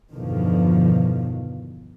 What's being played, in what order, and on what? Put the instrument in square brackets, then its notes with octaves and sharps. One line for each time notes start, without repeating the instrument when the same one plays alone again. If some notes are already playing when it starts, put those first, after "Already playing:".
[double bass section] E2 G2 B2 D3 D#3 F3